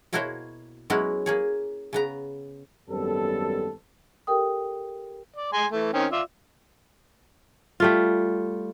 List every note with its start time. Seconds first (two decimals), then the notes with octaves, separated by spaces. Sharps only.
0.13 B2 A#3 E4 F#4 C5 C#5
0.90 F#3 G#3 B3 C#4 E4 F#4
1.26 A#3 G#4 C#5
1.93 C#3 B3 A#5
2.90 G#1 F#2 G3 B3 A4
4.27 G4 A4 A#4 G5 D#6
5.36 D5
5.53 G#3 G#5 C6
5.72 E3 A3
5.93 D#3 C4 C#4
6.12 F4 D5 E5
7.80 G3 A3 F4